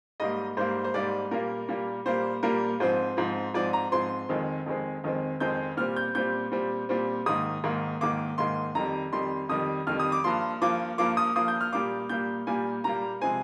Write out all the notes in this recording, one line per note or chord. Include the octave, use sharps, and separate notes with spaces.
G#2 G3 A#3 D#5
G#2 G3 A#3 C5
C5
G#2 G3 A#3 D5
A#2 G3 A#3 A#4
A#2 G3 A#3
A#2 G3 A#3 C5
A#2 G3 A#3 A#4
G#2 F3 C4 C5
G#2 F3 C4
G#2 F3 C4 D5
A#5
G#2 F3 C4 C6
F2 D#3 G#3 C4
F2 D#3 G#3 C4
F2 D#3 G#3 C4
F2 D#3 G#3 C4 G6
A#2 G3 C4 F6
G6
A#2 G3 C4 G6
A#2 G3 C4
A#2 G3 C4
G#2 D#3 A#3 D#6
G#2 D#3 A#3
G#2 D#3 A#3 D6
G#2 D#3 A#3 C6
F2 D#3 G3 A#5
F2 D#3 G3 C6
F2 D#3 G3 D#6
F2 D#3 G3 F6
D#6
D6
G2 F3 A#3 C6
G2 F3 A#3 D6
G2 F3 A#3 D6
D#6
G2 F3 A#3 D#6
G6
F6
A#2 G3 A#3 D6
A#2 G3 A#3 G6
A#2 G3 A#3 G#5
A#2 G3 A#3 A#5
C3 F3 G#3 C4 G#5